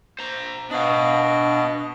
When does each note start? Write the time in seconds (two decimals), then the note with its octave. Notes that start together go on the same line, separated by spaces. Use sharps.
0.19 C5 A#5
0.71 B2 D4 D#5 F5